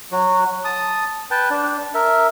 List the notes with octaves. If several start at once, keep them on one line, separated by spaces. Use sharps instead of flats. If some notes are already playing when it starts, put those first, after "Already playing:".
F#3 F#4
A5 D#6
B4 G5 A5
D4
A#4 E5